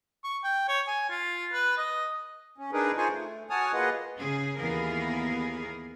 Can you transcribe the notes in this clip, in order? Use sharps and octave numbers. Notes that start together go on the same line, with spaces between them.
C#6
G5
C#5
G#5
F4
B4
D#5
C#4
D4 D#4 G#4 A#4 B4
D#4 F4 G#4 C5 G#5 C#6
A3
F#4 C#5 G#5 A5 D#6 F6
A#3 F4 G#4 B4 D#5 F#5
C#3 C#4 G#4
D#2 E3 B3 G#4 A#4 F5